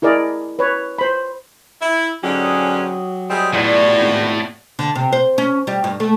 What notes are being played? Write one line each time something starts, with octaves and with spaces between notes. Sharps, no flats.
E4 G#4 A#4 D5 D#5
B4 C#5
C5 B5
E4
G#2 D3 F#3 C#4 G4 G#4 D#5
G3 G#3 C4 G#4 E5
E2 A2 G3 F4 F#4 E5
G#1
D3
C3
C5
C#4
G3
G2
A3